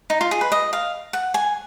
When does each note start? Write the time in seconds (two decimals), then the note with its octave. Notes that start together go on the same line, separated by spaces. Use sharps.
0.10 D#4
0.21 F4
0.31 G#4
0.41 B4
0.52 D#5
0.73 F5
1.13 F#5
1.34 G#5